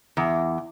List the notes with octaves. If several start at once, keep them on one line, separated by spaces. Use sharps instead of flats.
E2